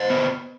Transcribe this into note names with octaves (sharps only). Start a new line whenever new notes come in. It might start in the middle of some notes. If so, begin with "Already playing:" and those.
Already playing: C5 D#5
B3